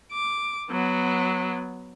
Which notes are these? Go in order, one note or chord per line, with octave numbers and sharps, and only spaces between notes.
D6
F#3 B3